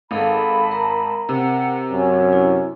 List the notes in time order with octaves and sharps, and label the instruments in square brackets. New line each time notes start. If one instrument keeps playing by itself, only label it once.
[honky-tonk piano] G#1 [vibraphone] G#4 A4 F5 [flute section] A5 B5
[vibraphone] A#4 A#5
[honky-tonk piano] C3 [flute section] F#5
[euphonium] F#2 [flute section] C#4
[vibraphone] E4